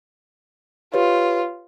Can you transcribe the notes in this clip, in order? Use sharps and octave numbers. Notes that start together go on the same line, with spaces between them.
F4 G4 B4 C#5